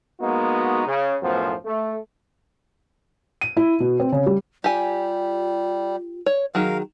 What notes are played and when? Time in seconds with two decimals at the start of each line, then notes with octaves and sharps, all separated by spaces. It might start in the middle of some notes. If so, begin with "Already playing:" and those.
0.20 G#3 A#3 B3 D#4 F#4
0.87 C#3
1.22 B1 F#2 A2 F3 B3 C5
1.65 A3
3.41 D#7
3.57 E4
3.80 B2
4.00 C4
4.12 C#3
4.26 G3
4.64 G3 F4 G4 G#5
6.26 C#5
6.55 D#3 F#3 G#4 A#4 F5